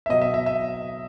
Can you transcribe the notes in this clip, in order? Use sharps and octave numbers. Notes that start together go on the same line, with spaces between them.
E5
B2 F#3 D#5
E5
E5
E5